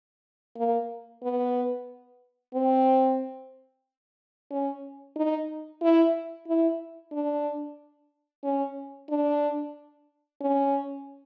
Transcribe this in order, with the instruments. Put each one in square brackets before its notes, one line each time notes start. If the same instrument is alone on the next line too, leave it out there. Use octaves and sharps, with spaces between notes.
[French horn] A#3
B3
C4
C#4
D#4
E4
E4
D4
C#4
D4
C#4